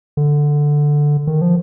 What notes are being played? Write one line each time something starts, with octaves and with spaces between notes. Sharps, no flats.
D3
D#3
F3